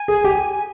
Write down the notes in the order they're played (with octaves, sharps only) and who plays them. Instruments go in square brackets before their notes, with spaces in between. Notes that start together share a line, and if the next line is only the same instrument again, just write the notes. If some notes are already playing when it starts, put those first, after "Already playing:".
Already playing: [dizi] G#5
[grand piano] G#4
G4